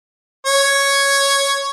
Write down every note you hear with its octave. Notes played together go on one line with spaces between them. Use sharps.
C#5